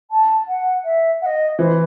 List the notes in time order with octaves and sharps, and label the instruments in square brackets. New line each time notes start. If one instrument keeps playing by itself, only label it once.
[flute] A5
F#5
E5
F#5
D#5
[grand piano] E3 [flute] C5